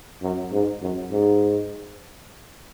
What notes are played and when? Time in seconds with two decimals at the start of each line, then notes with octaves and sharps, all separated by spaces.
0.22 F#2
0.52 G#2
0.82 F#2
1.11 G#2